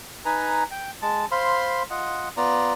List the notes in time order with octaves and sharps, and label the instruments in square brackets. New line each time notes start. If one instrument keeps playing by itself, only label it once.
[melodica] D#4 B4 G#5 A#5
G5
G#3 A5
C5 F5 B5 C6
F4 D#5 F#5
B3 F4 D5 A#5